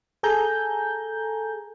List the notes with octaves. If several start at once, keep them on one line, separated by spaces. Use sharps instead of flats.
G#4 A4 G#5 A#5 G6